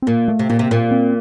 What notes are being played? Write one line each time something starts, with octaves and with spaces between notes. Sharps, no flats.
C4
A#2 A#3
A3
C3
A#2 A#3
C3
A#2
C4